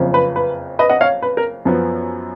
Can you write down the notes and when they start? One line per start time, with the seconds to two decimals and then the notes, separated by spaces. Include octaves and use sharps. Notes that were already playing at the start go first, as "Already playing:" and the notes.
Already playing: F#1 F2 C#3 F3
0.14 B4
0.36 B4
0.79 B4 D#5
0.90 D#5 F#5
1.01 C#5 F5
1.22 B4
1.37 A#4
1.65 F#2 F3 B3